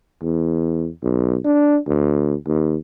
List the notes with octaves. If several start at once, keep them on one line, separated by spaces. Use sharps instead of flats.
E2
B1
D4
D2
D#2